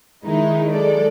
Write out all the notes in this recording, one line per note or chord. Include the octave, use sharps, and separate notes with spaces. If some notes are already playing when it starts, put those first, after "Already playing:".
D#3 G#3 D#4 E4
F#3 G#3 A4 D5